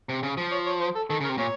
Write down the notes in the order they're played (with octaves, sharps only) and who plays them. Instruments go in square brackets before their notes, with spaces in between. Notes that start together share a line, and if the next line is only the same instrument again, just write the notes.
[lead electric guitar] C3
C#3
F3
[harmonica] C#5
C#5
C5
A4
[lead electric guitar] D#3 [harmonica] A4
[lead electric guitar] C#3
[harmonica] A#4
[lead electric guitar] C3
[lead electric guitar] A#2 [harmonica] C#5